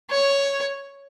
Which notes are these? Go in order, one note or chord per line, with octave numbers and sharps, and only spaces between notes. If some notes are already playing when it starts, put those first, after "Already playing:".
C#5